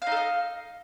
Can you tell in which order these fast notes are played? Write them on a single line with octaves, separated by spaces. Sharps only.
F5 D#4 A4 D#5